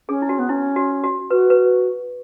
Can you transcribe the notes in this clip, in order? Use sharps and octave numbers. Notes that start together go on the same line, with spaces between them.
C#4 G#4
E4
F#4
B3
C#4 E4
F#4
F#4
F#4 B4
B4